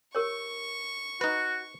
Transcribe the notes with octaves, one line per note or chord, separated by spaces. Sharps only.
G4 A#4 C#5 C#6
D#4 F#4 B4